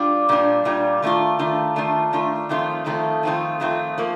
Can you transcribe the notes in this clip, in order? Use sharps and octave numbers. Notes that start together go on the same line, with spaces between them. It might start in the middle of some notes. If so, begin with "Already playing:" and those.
Already playing: G3 D4 F4
A#2 G3 D4 F4
A#2 G3 D4 F4
D#3 A3 D4 F4
D#3 A3 D4 F4
D#3 A3 D4 F4
D#3 A3 D4 F4
F2 D#3 A3 C4 F4
F2 D#3 A3 C4 F4
F2 D#3 A3 C4 F4
F2 D#3 A3 C4 F4
F3 A#3